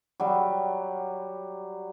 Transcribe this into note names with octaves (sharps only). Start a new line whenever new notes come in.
F#3 G3